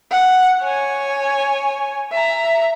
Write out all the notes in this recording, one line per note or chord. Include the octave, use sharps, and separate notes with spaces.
F#5
C#5 G#5
E5 A#5